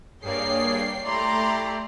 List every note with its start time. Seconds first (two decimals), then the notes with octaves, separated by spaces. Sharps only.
0.23 G2 A#3 G#4 C#5 D5 G5 C7
1.06 A3 E4 G4 D5 A#5 C6